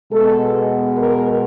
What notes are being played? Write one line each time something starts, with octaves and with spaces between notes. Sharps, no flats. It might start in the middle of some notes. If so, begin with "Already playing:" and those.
B2 G#3 B3 A4
A#4